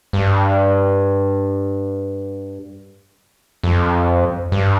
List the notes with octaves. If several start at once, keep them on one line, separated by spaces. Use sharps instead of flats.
G2
F2
G2